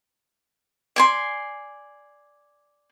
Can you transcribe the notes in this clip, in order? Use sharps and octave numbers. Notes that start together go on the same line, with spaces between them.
D5 G#5 C6